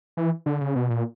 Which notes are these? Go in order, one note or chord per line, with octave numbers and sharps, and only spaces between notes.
E3
D3
C#3
B2
A#2